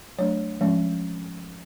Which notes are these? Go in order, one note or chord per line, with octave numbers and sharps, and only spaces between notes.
F#3 A3 D4 C#5
F3 G#3 C#4